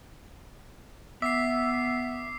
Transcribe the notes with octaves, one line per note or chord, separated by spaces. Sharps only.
B3 E5 D6 B6 C7